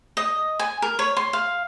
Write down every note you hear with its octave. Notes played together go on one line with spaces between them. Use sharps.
D#5
G#5
A#4
C#5
C6
F5